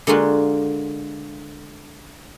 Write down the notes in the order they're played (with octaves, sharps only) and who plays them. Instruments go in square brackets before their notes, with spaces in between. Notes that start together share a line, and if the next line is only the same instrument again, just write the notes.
[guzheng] D3 G#3 A#3 F4 F#4